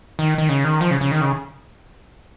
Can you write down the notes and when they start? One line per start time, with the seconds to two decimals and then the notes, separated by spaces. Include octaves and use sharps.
0.19 D#3
0.38 D#3
0.49 C#3
0.64 D#3
0.81 F3
0.91 C#3
1.01 C#3
1.11 D#3
1.21 C#3